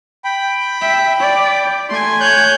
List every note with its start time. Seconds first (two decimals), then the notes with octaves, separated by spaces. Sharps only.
0.25 G5 B5
0.82 E5
1.20 D5
1.89 A3 G#5 C6
2.20 C#5 F#6 G6